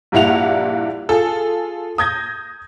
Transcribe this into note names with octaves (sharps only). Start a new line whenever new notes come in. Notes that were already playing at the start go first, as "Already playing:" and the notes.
A#1 G2 A#3 E4 F#5 F7
F4 G#4 A4
D#6 G6 G#6 A#6